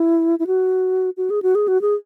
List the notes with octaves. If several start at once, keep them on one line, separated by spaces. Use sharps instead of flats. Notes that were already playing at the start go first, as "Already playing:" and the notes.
Already playing: E4
E4
F#4
F#4
G#4
F#4
G#4
F#4
G#4